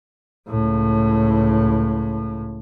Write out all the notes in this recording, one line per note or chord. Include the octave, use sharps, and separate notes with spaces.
C#2 A2